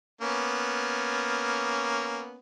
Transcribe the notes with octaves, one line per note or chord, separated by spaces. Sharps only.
A#3 B3 C#4